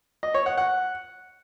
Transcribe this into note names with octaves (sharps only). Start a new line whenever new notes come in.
D#5
C#5
F#5
F#5